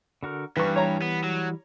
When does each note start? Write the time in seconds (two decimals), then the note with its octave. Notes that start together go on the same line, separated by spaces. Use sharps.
0.23 D3 F#4 A#4
0.57 G2 E3 G3 B4 C#6
0.76 C#5 A#5
1.02 B3
1.24 F#3